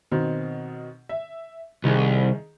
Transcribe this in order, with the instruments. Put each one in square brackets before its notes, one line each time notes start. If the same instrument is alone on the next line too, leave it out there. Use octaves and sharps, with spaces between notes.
[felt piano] B2 D#3 C4
E5
[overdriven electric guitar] C2 [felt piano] D#3 G#4